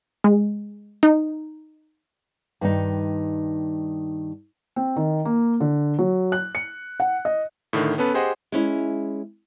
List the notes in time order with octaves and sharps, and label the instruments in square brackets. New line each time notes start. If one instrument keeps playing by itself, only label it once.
[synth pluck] G#3
D#4
[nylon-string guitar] G2 D#3 D#4
[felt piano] C4
D#3
A#3
D3
F#3
F#6
C#7
F#5
D#5
[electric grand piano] A2 D3 D#3
B3 C#4 A4 B4
G4 G#4 C5 D#5 F#5
[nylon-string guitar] G#3 C#4 E4